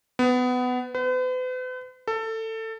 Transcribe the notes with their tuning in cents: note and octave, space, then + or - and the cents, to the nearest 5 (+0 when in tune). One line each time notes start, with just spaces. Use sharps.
B3 +20
B4 +45
A4 +20